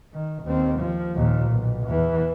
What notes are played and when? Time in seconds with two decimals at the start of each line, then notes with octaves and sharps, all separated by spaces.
0.13 D#3
0.43 D#2 C4
0.80 F3
1.15 D#2 A#2
1.51 B1
1.87 E2 E3